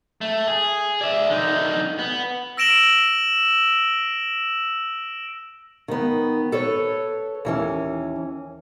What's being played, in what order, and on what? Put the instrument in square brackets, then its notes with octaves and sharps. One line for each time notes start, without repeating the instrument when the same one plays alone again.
[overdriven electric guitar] A3
G#4
D5 E5
D3 D#4
B3
[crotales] E6 A#6 D7 E7 F#7 G7
[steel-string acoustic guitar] D#3 B3
A4 B4 C#5
D#2 E3 C#4